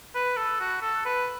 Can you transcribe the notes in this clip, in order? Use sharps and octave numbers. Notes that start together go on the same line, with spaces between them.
B4
A4
F#4
A4
B4